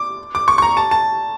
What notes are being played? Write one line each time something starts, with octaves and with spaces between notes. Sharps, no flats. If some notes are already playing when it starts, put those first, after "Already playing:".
Already playing: D6
D6
C#6
C#6
A#5
A5
A5